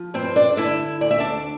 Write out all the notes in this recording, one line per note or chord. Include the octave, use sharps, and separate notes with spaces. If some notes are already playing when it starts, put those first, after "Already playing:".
Already playing: F3
G2 C4 C5
D4 D5
D3 E4 E5
D2 D5
E5
D4 D5